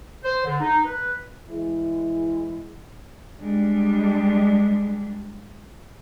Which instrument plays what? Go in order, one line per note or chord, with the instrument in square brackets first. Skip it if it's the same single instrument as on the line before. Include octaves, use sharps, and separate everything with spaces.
[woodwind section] C5
D3
D#4
B4
[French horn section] E3 G#3 E4
[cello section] G3 G#3 D4